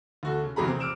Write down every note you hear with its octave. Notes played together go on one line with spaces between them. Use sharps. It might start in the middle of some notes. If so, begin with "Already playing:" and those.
D2 F#4 A4
C#3
G#1 E2 C3 G#4 A#5 B5
C4
D6 E6 F6 D7 E7